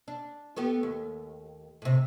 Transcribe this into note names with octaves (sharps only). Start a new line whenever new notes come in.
D4
A3 B3 G4
D#2
A2 C3